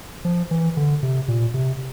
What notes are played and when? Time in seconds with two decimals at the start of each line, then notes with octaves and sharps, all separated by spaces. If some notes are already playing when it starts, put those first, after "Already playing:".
0.25 F3
0.51 E3
0.77 D3
1.03 C3
1.28 A#2
1.54 C3